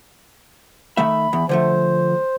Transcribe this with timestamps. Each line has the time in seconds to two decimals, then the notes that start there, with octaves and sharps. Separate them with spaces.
0.97 D#3 A3 E5 B5
1.33 E2
1.49 D3 F3 A3 C5